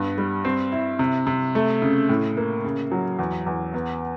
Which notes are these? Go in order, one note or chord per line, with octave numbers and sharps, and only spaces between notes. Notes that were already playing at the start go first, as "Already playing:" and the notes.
Already playing: G2 B3
G3
C4
E4
C3
C3
A3
C#3
A2
A#3
C#3
F#3
E2
E2
B3